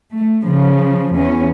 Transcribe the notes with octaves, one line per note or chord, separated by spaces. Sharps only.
A3
C#3 F3
E2 C#4